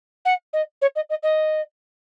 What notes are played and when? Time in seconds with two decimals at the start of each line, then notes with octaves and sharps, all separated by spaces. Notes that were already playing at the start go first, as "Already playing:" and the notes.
0.25 F#5
0.53 D#5
0.81 C#5
0.95 D#5
1.09 D#5
1.23 D#5